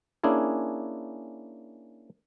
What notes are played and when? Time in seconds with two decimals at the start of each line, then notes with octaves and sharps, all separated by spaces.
0.23 A#3 C#4 D4 E4 G#4